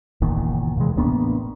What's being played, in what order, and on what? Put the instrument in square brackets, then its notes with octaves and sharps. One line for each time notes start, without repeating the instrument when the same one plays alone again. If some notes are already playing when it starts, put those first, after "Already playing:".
[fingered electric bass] F#1 E2 A#2 D#3
D#2 C3 E3 G#3
A1 A#3 B3 D4